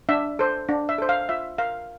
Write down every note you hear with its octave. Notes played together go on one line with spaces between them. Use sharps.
D4 E5
A4 C5
D4
E5
A4 C5
F5
F4 E5
A#4 F5